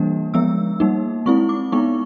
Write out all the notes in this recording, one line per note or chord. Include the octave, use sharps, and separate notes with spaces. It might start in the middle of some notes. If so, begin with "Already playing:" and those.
Already playing: E3 G3 A#3 D4
F3 G#3 B3 E6
G3 A#3 D#4
G#3 C4 E4 C#6
D6
G#3 B3 D#4 C#6